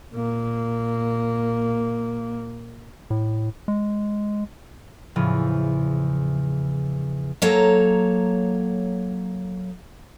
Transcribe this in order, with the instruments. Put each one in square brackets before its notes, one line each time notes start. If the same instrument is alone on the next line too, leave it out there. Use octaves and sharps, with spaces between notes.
[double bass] A#2 A#3
[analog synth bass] A2
G#3
[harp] E2 A2 C#3 F3
[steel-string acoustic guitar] F#3 A#3 A4 C#5 A#5